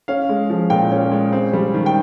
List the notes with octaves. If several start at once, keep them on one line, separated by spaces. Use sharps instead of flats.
C#4 F5
G#3
F3
A#2 G5
C#4
G#3
C4
G3
D#3
G5